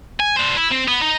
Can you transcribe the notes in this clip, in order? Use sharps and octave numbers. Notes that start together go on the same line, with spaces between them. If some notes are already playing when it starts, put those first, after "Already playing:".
G#5
D4 C5
E4
C4
B3
D#4